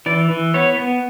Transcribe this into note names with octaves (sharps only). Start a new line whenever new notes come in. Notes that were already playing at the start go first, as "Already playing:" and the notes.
E3 D5
E3
B3 C#5
B3